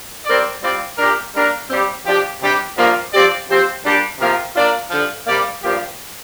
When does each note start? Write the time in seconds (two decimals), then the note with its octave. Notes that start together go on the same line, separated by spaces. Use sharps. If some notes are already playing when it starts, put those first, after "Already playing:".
0.25 G3 C4 A#4 D5
0.62 G3 C4 F4 D5
0.97 A#2 A#3 D4 G4 A#4
1.33 G3 A#3 D4 A#4
1.68 G2 G3 C4 G4
2.05 F3 D4 G4
2.40 C3 G3 D4 G4
2.76 G2 F3 A#3
3.12 F3 C4 G4 D5
3.48 F3 C4 G4 C5
3.83 A#2 G3 D4 G4
4.19 C3 F3 A#3 F4 A#4
4.54 A#3 D4 F4 A#4 D5
4.90 G2 D3 F3
5.26 C3 G3 A#3 G4 D5
5.62 G2 F3 A#3 G4